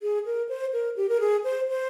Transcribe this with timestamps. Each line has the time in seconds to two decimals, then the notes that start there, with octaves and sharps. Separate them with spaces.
0.02 G#4
0.26 A#4
0.49 C5
0.73 A#4
0.96 G4
1.09 A#4
1.20 G#4
1.44 C5
1.69 C5